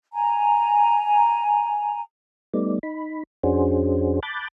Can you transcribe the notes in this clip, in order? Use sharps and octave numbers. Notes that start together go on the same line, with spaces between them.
G#5 A#5
G3 A3 B3 D#4 D5
D#4 B5
F2 C#4 D4 F#4 G#4 C5
A5 B5 D6 F#6 G6 A6